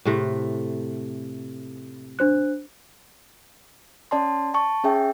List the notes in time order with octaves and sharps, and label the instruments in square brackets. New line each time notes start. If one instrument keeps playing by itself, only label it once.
[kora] A2 C3 A3
[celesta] D4 C5 F#6
[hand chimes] C#4 D5 A5 C6
A5 C#6
C#4 G#4 E5 G5